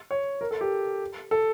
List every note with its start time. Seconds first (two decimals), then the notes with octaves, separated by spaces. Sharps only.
0.11 C#5
0.41 A#4
0.51 A4
0.61 G4
1.31 A4